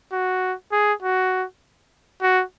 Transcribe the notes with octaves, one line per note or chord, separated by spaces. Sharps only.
F#4
G#4
F#4
F#4